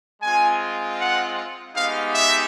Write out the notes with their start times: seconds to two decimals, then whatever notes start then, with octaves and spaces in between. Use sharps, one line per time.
0.22 G#3 C4 F4 G#5
0.99 F#5
1.75 G#3 B3 D#4 G4 F5
2.14 E5